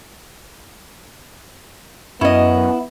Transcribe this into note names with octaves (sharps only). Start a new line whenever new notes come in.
F#2 B3 C#4 E4 D#5